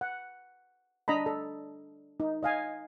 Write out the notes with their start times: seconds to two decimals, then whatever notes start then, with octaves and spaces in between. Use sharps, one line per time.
0.01 F#5
1.08 D4 D#5 A#5 B5
1.26 A4
2.20 D#4
2.43 D#5 F5 G#5